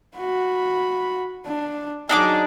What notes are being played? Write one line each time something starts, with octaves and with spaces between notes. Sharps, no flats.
F#4 B5
D4
F#3 D4 D#4 G#4 D6